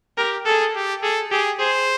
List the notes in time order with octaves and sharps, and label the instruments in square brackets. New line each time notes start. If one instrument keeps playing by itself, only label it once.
[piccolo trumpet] G4 [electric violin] A#4
[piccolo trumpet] G#4 [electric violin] A4
[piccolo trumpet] G4
[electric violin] G#4 [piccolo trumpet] A4
[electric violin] G4 [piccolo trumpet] G#4
[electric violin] G#4 [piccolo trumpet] C5